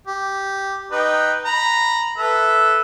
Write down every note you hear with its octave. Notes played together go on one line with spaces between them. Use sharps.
G4
D#4 B4 G5
A#5 B5
A4 B4 E5